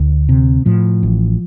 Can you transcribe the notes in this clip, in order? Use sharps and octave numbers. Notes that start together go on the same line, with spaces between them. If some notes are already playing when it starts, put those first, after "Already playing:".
Already playing: D2
C3
A2 F3
A1